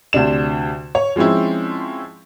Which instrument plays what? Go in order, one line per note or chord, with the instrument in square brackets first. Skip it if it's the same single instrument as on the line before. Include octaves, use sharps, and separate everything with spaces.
[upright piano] D2 C3 D4 E7
C#5
F3 G#3 C4 C#4 E4